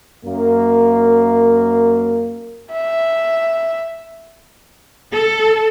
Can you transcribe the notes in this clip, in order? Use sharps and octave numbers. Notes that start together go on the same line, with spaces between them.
F#2 A#3
E5
A4